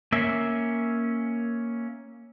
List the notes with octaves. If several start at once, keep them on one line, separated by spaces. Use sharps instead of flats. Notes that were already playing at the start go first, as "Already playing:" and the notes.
A#3 C#4 E5